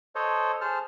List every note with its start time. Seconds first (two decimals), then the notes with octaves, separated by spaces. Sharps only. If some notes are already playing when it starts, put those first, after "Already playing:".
0.15 A4 C5 C#5 D#5
0.61 G#4 C5 A5 F6